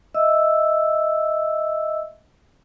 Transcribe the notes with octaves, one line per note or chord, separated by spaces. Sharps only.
D#5 E5 E6